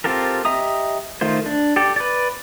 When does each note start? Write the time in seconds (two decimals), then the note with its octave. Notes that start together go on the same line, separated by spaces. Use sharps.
0.04 C4 F4 G4 A4 A#4
0.45 G4 D#5 E5 A#5 D#6
1.21 D#3 A3 F4 C5
1.46 D4
1.76 G4 A4 D5
1.96 B4 D5